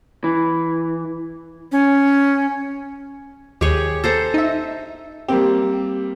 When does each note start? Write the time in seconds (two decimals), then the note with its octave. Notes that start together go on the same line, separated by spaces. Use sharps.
0.24 E3
1.72 C#4
3.61 D#2 G4 G#4 C#5
4.04 A4 C5 A#5
4.34 D#4 E5
5.28 G3 A#3 C4 G4